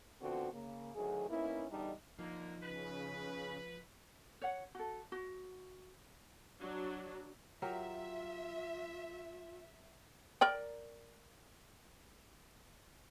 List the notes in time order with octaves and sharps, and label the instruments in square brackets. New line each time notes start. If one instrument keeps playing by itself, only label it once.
[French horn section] D3 F3 B3 C4 F#4
C#3 A#3
D2 D#3 F#3 G#4
A#3 B3 C#4 D#4 E4
E2 D3 G3 D4 D#4
[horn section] D3 A#3 [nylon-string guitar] F3 D#4
[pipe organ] C#3 [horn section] B4
[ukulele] C#5 F#5
F#4 A4
F#4
[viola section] F#3 D4
[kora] F#3 G4 A#4 [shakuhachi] F4 [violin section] E5
[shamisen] A#4 D5 G5